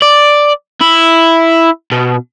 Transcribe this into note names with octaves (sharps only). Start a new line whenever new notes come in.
D5
E4
B2